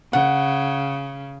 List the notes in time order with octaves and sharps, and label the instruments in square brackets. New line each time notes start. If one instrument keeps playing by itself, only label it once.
[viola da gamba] C#3 [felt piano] F#5